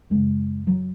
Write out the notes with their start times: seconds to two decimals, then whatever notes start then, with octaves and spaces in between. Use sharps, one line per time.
0.10 F#2 C#3 G#3
0.67 F#3